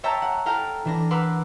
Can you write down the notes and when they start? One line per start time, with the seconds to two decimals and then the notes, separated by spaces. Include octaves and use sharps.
0.04 C#5 E5 G5 A5 A#5
0.22 F#5
0.46 E4 A4 F5 G5 A#5
0.85 E3 D4 A#6
1.10 A#4 B4 F#5 C6 D6 E6